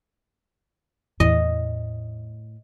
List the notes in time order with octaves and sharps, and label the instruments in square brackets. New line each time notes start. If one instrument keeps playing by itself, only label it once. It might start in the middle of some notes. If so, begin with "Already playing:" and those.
[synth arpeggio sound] E2 [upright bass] A2 [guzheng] D#5